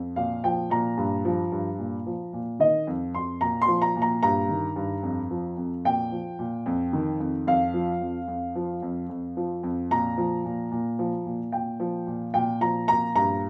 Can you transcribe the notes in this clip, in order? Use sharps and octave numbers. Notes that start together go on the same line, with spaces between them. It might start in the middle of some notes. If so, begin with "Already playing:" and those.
Already playing: F2
A#2 F5
F3 G5
A#2 A#5
G2
F3
G2
A#2
F3
A#2
D#3 D#5
F2
F2 C6
A#2 A#5
C6
F3
A#5
A#2
A#5
G2 A#5
D#3
G2
F2
F3
F2
A#2 G5
F3
A#2
F2
D#3
F2
F2 F5
F3
F2
F2
F3
F2
F2
F3
F2
A#2 A#5
F3
A#2
A#2
F3
A#2
A#2 G5
F3
A#2
A#2 G5
F3 A#5
A#2 A#5
G2 A#5